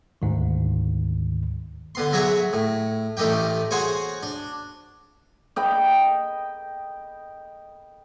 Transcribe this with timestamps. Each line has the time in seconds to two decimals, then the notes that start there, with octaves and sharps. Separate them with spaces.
0.22 D2 G#2 D#3
1.95 D3 B3 C6
2.12 F#3 F#4 G#4 C#5 E5
2.53 A2
3.17 A1 A3 D#4 G4 G5
3.71 F#4 G#4 C5 C#5 G#5
4.23 D4
5.56 D#5 G5 B5